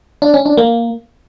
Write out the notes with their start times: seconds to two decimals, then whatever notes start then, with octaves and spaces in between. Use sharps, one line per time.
0.22 D4
0.34 C#4
0.46 D4
0.57 A#3